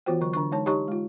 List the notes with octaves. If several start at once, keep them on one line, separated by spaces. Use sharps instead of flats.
E3 B3 F4 F#4 C5 G5
D3 F#3 C#6
D3 D4 C#6
G#3 D#4 C#5 A5
D#4 G4 C#5 D#5 A#5 C#6
G#3 F4